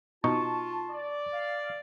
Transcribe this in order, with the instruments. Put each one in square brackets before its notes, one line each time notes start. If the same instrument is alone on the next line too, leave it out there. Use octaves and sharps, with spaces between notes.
[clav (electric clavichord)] B2 D#4 [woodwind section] F4 A5 [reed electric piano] C#6
[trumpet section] D5
[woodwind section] F5